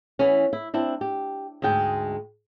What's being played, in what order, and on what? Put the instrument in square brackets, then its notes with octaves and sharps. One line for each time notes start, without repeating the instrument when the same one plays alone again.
[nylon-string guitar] E3 B3 C#4
E4
C4 D4 E4
G4
D2 G#2 G#3 G5